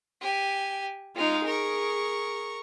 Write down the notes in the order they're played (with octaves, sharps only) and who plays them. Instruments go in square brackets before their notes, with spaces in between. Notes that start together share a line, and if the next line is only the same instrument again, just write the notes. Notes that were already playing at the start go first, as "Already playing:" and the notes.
[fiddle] G4 G#5
[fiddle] G#3 F5 [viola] D#4 F4
[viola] G#4 [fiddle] A#4 C#6